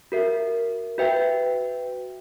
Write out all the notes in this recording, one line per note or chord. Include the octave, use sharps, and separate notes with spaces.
F#4 A#4 E5
F#4 B4 E5 G5